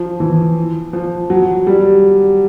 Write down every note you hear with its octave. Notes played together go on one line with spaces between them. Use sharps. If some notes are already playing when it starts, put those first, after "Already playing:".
Already playing: F3
E3
F3
F#3
G3